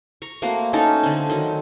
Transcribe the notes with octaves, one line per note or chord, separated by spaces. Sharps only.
A#5 C#6
A3 A#3 C4 F#4
C#4 D#4 A4
D3 C4
D#3 F#3